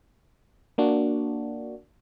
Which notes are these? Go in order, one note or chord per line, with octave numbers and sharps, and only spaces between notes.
A#3 D4 F#4